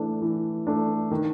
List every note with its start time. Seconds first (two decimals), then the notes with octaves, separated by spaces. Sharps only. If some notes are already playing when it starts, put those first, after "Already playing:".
Already playing: E3 A3 D4
0.22 E3
0.67 A3 D4
1.11 D#3